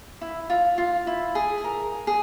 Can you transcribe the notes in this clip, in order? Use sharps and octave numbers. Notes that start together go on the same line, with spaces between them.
E4
F4
F4
E4
G#4
A#4
G#4